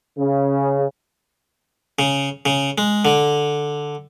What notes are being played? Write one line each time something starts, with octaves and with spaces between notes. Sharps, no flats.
C#3
C#3
C#3
G#3
D3